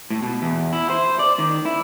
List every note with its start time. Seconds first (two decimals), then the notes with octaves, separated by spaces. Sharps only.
0.10 A2
0.22 B2
0.42 E2
0.73 E4
0.90 C5
1.19 D5
1.39 D#3
1.66 E4